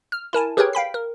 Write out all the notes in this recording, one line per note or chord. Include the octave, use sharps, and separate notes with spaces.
F6
E4 A#4 G#5 A5
G4 G#4 A#4 B4 C#5 G5
F5 G5 B5 B6
A#4